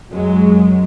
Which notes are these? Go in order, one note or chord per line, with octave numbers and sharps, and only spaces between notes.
F#2 F#3 G#3